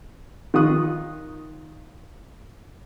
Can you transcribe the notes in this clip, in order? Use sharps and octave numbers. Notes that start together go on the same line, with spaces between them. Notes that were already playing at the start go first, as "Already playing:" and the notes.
D#3 F4 C#6 D#6 F#6